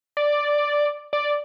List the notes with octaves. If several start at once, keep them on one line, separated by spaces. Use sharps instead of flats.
D5
D5